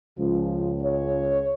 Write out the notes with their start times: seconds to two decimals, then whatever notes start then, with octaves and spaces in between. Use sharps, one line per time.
0.18 C#2 F3
0.83 C#5